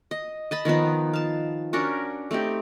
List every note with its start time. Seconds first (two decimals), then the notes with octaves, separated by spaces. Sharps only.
0.11 D#5
0.51 D#5 A5 B5
0.65 D#3 F3 B3 D#4
1.13 F5 A5
1.73 C#4 D4 F#4 A#4
2.31 A3 C4 D#4 G4